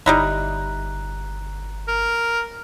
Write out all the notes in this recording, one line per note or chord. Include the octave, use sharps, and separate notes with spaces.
G1 G3 D#4 E4 A#5 F#6
A#4